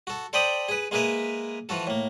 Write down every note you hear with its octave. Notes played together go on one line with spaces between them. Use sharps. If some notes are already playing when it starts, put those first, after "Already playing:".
F#4 A4
A4 C5 D5 G5 B5 D#6
G#4 B4
G#3 A#3 G#4 A#4 B4 E5
E3 F3 F#4 A4
A2 A#3